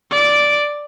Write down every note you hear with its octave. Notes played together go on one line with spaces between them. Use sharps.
D5 D7